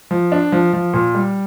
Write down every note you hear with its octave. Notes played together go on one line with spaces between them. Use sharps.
F3
D4
F3
F3
A#2
G3